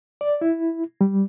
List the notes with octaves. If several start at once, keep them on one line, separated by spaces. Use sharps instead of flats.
D5
E4
G3